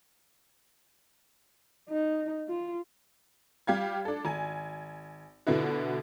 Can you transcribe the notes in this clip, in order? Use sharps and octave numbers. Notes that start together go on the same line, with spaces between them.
D#4
F4
G3 G4 F5 G#6
D4 A4
G#1 G#5
B2 D3 B3 E4 F#4